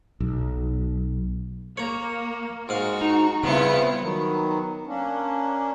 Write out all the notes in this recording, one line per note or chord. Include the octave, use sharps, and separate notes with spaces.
B1
A#3 C#5 A#5
G#2 F#4 F5 C#6
D#4
G2 C#3 B3 C4 E4 F4 C#7
D#3 F#3 B3
A#3 C#4 D4